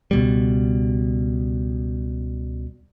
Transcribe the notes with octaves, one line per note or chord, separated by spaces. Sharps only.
C#2 B2 G3